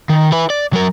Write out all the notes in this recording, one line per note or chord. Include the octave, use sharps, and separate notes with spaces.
D#3
E4 B4
D5
F#3 A#4